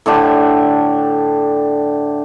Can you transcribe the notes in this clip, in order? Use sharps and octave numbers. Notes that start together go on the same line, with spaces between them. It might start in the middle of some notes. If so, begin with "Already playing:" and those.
A2 D3 D4 G4